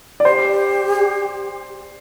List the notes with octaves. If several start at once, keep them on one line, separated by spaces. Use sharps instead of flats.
D5
G4 C5